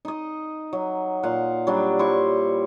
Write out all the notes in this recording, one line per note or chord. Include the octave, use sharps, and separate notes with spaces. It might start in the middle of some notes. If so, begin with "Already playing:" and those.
D#4 D#5
F#3
A#2 F5 F#5
F#3 G3 D4
E4 C5 C#6